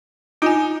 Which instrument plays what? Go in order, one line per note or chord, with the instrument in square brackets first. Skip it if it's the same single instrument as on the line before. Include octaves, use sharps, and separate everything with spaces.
[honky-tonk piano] D#4 [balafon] F4 G#5